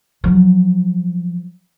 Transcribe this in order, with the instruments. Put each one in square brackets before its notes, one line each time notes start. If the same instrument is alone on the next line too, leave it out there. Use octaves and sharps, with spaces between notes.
[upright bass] F3 F#3